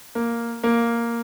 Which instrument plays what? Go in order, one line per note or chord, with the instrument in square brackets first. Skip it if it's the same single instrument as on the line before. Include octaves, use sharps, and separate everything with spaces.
[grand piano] A#3
A#3